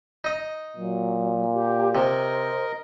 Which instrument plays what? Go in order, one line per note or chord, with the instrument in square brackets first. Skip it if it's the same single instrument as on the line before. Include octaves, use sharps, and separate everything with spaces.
[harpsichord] D#4 D#5
[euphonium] A#2 [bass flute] F#3
[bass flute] G4
[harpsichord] C3 [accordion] A#4 D#5 [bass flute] C5